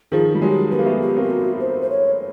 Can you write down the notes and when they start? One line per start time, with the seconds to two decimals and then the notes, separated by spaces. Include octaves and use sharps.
0.12 D#3 F3 G#4
0.35 G3
0.42 F#3 G#3 G4
0.72 B3 G4
0.79 A#3
0.86 A3 B3
1.02 G4
1.17 A#3 C4
1.23 G4
1.31 F#4
1.60 C5
1.81 C5
1.90 C#5